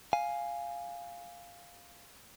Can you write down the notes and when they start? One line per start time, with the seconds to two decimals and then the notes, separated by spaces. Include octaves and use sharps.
0.13 F5 G#5